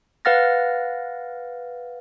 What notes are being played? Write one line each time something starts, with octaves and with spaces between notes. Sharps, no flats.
B4 F5 F#5 F6 A6 A#6